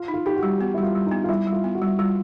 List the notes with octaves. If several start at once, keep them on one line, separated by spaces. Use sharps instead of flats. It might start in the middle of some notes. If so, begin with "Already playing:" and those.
Already playing: F4
D#4
F4
D#4 G4
F#4
G3
B3 F#4
G3 E4
F4
G3
D#4
B3
F4
G3 E4
G3
F4
B3
F#4
G3
G3 F4